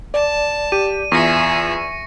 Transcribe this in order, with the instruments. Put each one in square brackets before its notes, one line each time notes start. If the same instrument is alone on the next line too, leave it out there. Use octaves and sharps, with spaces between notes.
[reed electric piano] D5 [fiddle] A5
[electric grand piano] G4 [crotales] D#7
[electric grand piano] E2 F4 [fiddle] G#4 E5 [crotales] C#6 A#6 C#7